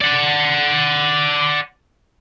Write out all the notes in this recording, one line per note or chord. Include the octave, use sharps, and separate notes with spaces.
D5 F#5